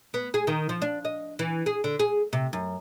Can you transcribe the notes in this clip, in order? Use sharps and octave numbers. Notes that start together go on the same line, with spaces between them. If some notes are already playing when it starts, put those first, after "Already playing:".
B3
G#4
D#3
F3
D4
D#5
E3
G#4
D3
G#4
C3
F#2